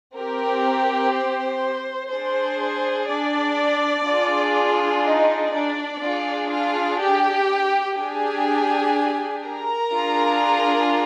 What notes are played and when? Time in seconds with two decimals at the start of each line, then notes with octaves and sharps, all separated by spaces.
0.17 C4 G4 A#4
1.14 C5
2.12 D4 G#4 C5
3.10 D4 D5
4.08 D4 F4 G#4
5.05 D#4 D#5
5.54 D4 D5
6.03 D4 F4 G#4
6.52 F4 F5
7.00 G4 G5
7.98 D4 G4 G#4 G#5
9.45 A#4 A#5
9.94 D4 F4 G#4